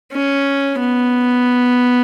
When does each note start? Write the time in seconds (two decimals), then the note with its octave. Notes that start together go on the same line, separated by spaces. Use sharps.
0.12 C#4
0.79 B3